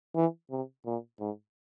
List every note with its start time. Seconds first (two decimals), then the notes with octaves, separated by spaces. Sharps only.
0.15 E3
0.51 C3
0.86 A#2
1.20 G#2